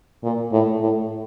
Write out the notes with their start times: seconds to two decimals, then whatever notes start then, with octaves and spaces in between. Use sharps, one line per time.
0.23 A#2
0.52 A2
0.81 A2